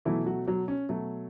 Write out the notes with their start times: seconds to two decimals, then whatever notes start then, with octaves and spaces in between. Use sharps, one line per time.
0.05 B2 E3 F#3 A3 E4
0.26 F#3 F#4
0.47 F#3 F#4
0.68 C#4
0.89 B2 F#3 A3